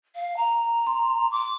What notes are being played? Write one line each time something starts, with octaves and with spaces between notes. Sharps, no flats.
F5
A#5
C6
D6